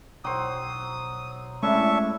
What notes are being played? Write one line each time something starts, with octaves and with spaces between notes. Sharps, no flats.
B1 F#3 C5 G5 D#6
G#3 A3 C#4 D4 E4 E5 C#6